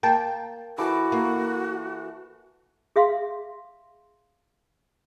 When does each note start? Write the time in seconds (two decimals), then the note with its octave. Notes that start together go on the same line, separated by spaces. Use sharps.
0.03 A#3 G5 A5
0.78 E3 F#4 A4 D6
1.12 A#3
2.96 G#4 E5 F5 C6